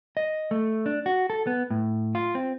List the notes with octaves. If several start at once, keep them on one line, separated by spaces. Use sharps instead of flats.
D#5
A3
D4
F#4
A4
B3
A2
F4
C4